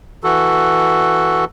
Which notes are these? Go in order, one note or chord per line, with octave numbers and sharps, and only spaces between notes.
E3 F#4 A4